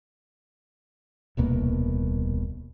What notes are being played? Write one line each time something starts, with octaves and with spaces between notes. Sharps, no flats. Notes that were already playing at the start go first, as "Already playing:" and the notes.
D#1 C2 B2 A#3